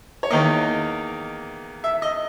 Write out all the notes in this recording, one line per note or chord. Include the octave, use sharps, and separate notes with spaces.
C#5
E2 D#3 A#3 D#5
E5
D#5